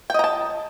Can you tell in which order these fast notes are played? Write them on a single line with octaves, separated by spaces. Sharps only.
G5 D#5 A#5 A5